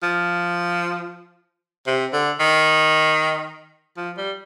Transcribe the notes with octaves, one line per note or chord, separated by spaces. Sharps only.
F3
C3
D3
D#3
F3
G3